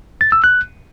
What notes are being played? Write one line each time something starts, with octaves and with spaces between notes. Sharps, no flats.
A6
E6
F#6